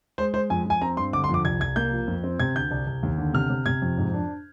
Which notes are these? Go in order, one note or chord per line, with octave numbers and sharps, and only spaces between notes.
G#3 C5
G#3 C5
F2 G#5
F2 G#5
C4 A#5
G2 C6
D3 D6
C6
F2 D6
C2 G#6
C2 G#6
A#3 G6
F3
F2
C4
C3 G#6
D2 G6
C2
C2
D#2
D3
C3 F6
C3
C3 G#6
F2
G#2
D4